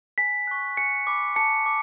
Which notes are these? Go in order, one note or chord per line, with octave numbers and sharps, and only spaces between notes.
G#5 B6
C#6 F#6
G#5 C#7
B5 D6
A5 C#7
D6